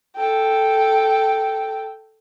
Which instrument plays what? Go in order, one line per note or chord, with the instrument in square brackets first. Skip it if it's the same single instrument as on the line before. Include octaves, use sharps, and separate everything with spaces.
[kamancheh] A4 G5